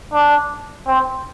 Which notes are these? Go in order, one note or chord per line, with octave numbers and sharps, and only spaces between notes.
D4
C4